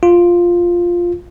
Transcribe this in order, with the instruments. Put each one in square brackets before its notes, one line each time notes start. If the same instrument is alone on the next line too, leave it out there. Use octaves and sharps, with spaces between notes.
[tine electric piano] F4